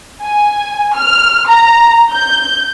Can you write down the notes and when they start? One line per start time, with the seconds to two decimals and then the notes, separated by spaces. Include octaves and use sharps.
0.22 G#5
0.94 F6
1.47 A#5
2.12 G6